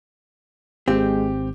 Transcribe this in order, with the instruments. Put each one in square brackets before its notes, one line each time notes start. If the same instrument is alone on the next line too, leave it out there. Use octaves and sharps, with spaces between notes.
[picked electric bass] G#1 [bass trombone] G#3 [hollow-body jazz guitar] C4 [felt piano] G4